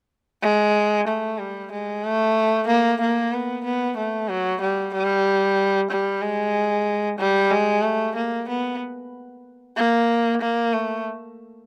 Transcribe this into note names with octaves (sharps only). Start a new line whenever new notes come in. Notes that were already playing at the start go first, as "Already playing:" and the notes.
G#3
A3
G3
G#3
A3
A#3
A#3
B3
B3
A3
F#3
G3
G3
G3
G#3
G3
G#3
A3
A#3
B3
A#3
A#3
A3